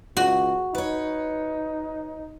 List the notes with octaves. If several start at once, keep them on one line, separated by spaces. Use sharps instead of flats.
C#2 F#4
D#4 B4 C#5